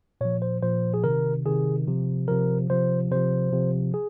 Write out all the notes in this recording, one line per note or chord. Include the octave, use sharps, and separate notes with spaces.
A#2 F3 C#5
C5
A#2 F3 C5
G#4
C3 D#3 A#4
C3 D#3 G#4
C3 F3
C3 F3 A#4
C3 F3 C5
C3 F3 C5
C3 F3
G#4